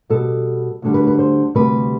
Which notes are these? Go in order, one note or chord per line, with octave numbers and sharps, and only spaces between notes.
B2 G3 A4
D2 D3 G3
B4
B4
C5
D2 C3 G3 B4